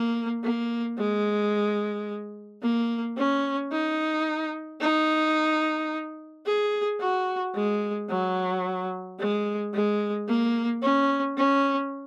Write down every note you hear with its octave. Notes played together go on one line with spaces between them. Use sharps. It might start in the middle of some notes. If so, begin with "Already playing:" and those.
Already playing: A#3
A#3
G#3
A#3
C#4
D#4
D#4
G#4
F#4
G#3
F#3
G#3
G#3
A#3
C#4
C#4